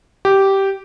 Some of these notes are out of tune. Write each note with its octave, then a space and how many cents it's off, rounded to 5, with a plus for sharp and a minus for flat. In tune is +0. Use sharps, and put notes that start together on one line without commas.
G4 -10